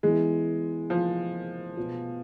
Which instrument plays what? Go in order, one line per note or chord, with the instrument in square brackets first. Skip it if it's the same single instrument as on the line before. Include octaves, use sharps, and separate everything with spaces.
[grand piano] E3 B3 E4 [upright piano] G#3
[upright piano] F3
[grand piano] B2 B3 F4